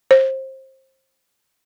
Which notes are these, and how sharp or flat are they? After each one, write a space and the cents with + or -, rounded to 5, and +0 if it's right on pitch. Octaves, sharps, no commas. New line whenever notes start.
C5 +25